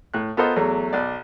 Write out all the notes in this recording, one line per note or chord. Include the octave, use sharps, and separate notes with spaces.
A2 F#6
B3 F4 A4 A#4 C5 D#5
E2 F#3 A3
B1 D5